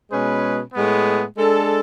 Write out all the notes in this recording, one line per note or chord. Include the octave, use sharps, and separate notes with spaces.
B2 G#3 C#4 G#4 B4
A2 G#3 B3
G#3 D4 A4